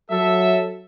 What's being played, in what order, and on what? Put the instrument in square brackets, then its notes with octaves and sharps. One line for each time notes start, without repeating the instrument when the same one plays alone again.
[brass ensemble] F#3 A4 E5